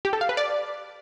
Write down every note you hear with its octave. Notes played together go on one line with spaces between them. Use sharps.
G4
A4
F5
B4
D5